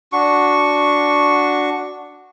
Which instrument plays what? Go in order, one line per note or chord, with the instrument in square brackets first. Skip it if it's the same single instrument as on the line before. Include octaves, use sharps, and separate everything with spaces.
[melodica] D4 F#4 C#6